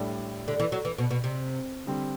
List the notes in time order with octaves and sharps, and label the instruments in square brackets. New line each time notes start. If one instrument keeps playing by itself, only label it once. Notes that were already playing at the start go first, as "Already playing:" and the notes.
Already playing: [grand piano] A2 G3 D4 A4 D5
[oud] D3
E3
F#3
E3
B2
B2
C3
[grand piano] D3 G3 C4